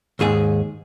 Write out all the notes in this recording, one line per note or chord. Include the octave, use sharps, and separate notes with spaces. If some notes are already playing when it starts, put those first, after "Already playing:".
D#2 G#2 G#4 G#5